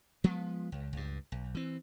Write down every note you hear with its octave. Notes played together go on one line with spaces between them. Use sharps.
F3 G#3 B3
C#2
C#2 G2
B1
E3 C4